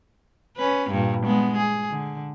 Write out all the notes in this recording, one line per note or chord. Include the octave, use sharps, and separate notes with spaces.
C#4 B4
G2 A#2
G#3 B3
G#4
D3